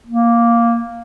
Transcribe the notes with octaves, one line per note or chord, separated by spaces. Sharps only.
A#3